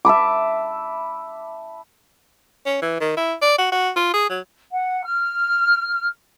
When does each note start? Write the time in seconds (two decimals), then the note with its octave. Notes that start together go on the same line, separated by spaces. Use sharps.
0.05 E5 A5 B5 D6
2.65 C#4
2.82 E3
3.00 D#3
3.17 E4
3.42 D5
3.58 F#4
3.72 F#4
3.96 F4
4.13 G#4
4.29 F#3
4.73 F#5
5.04 F6